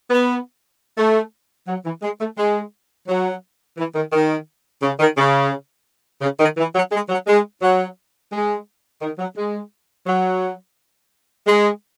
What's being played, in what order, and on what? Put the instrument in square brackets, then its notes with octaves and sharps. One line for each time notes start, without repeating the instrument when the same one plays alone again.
[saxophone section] B3
A3
F#3
E3
G#3
A3
G#3
F#3
E3
D#3
D#3
C#3
D#3
C#3
C#3
D#3
E3
F#3
G#3
F#3
G#3
F#3
G#3
D#3
F#3
G#3
F#3
G#3